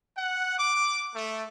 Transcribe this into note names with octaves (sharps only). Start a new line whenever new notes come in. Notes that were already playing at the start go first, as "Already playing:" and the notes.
F#5
D6
A3